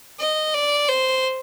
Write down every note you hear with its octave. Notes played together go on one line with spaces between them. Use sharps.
D#5
D5
C5